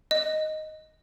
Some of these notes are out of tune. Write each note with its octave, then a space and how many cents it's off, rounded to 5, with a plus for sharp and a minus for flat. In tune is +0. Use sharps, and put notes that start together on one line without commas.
D#5 +0